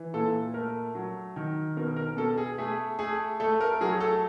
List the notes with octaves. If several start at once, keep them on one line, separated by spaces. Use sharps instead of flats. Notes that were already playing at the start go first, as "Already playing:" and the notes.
Already playing: E3
A#2 A4
A3 A#4
F#3
D#3
B2 A#4
A#4
B2 A4
G#4
A3 G#4
A3 G#4
A3 A4
A#4
F#3 G#4
A4